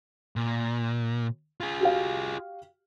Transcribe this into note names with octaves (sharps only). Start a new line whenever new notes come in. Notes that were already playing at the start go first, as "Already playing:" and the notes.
A#2
F4 G#4
F#4 G4 F5